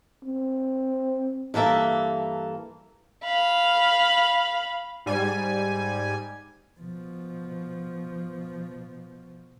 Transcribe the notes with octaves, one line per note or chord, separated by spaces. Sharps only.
C4
G2 E3 A#3 A4 E5
F5 B5
G#2 G3 G#5
B2 F3